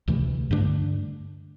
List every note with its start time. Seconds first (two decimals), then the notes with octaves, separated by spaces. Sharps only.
0.08 D2 C3 E3 A3
0.51 G2 D3 A3 D4